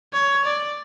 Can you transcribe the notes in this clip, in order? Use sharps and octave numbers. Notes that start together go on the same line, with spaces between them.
C#5
D5